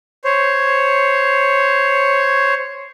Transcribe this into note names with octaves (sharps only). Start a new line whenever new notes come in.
C5 C#5